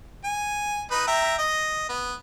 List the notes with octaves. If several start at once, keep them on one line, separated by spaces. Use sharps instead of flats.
G#5
D#4 B4
E5 G5 A#5
D#5
B3